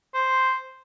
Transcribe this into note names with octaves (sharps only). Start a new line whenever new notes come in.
C5